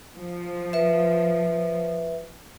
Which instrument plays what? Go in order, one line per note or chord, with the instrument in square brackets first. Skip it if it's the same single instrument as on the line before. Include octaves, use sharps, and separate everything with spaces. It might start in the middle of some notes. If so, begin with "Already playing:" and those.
[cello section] F3
[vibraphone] B4 E5